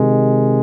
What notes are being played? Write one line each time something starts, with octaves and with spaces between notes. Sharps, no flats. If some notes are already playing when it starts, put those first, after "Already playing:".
Already playing: C3 D#3 G#3